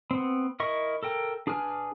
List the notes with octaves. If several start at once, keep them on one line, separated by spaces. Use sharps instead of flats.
B3 C4
E4 A#4 D#5 C#6
A4 A#4 G5
D4 G#4 B4 G#5 F6